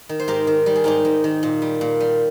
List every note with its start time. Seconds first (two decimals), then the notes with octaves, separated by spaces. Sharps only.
0.09 D#3
0.19 C5
0.28 G#2 G4 A#4
0.47 D#3
0.66 G3
0.75 G#4
0.84 G#2 D#4 G4
1.05 G#2
1.24 D#3
1.43 A#2
1.62 G3
1.81 A#2
2.00 G3